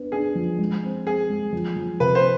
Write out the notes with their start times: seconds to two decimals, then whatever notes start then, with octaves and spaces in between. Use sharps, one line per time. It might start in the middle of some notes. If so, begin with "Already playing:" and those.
Already playing: B3 D4
0.12 D4 G#4
0.35 F3
0.59 G#3
0.83 C4
1.06 C4 G#4
1.29 G#3
1.52 F3
1.76 F3
2.00 C3 B4
2.15 C5